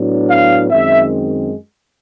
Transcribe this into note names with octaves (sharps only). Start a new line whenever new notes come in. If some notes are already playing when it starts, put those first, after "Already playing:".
Already playing: A2 F#3 B3 D4
F5
F#2 D#3 G#3 C4 E5